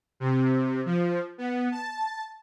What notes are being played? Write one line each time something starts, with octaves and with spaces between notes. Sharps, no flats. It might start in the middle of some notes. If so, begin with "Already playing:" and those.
C3
F3
B3
A5